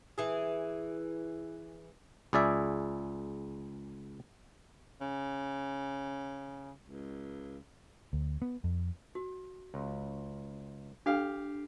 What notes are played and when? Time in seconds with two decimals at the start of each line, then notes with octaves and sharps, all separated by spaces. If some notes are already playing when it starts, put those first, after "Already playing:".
0.18 E3 G#4
2.33 C#2 G#4 D5 E5
5.01 C#3
6.88 C#2
8.13 D2
8.42 B3
8.64 F2
9.15 F#4
9.74 C#2
11.06 D4 G4 A4 F5